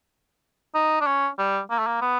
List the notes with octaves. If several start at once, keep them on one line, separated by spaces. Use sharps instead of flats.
D#4
D4
C#4
G3
A#3
A3
A#3
B3